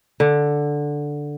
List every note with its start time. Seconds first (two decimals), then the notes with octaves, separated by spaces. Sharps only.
0.20 D3